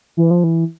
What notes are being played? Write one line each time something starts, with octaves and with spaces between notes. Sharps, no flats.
E3
F3
E3